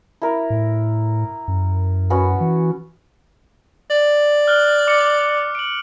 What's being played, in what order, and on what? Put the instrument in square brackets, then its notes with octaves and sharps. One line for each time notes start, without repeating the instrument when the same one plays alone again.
[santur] E4 A#4
[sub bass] A2
F#2
[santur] B3 C#4 F#4
[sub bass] E3
[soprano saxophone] D5
[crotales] F6 F#6 G7
D6 C#7
D7 F#7